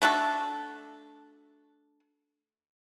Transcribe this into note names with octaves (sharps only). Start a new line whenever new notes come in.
A3 D4 F#4 A4